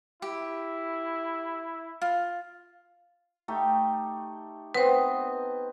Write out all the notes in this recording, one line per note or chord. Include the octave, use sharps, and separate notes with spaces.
E4 G4
F4
A3 D#4 G4
B3 C4 B4 C5 D#5